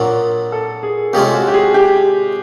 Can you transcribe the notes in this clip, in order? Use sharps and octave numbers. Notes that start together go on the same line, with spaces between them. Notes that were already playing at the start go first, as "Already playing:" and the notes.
Already playing: A#1 A#2 F#3
A4
G#4
F2 C3 F3 G#3 C#4 G4
F#4
G4
G#4
G4